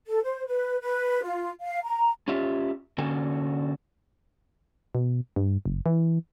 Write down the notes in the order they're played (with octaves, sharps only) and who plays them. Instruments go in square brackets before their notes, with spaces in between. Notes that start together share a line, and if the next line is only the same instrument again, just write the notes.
[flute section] A4
C5
B4
B4
F4
F5
A#5
[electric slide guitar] C#4 F4 G4 E5
D3 A#3 C#4 F#4 A4 G#5
[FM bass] B2
G2
F#1
E3